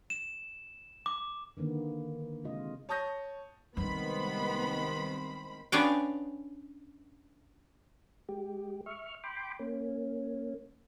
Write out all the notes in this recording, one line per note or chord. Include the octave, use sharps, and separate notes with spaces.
E7
D6
D3 D#3 A#3 B3
C3 G#3 F4 D#5
C#5 A5 C#6 D#6 G6 A#6
C2 D#3 G3 G#3 B3 D#4 C5 B5
B3 C#4 D4 G#4 F5 G5
G#3 G4
E5 C#6 F6
G5 B5 C6 D6
A#3 C#4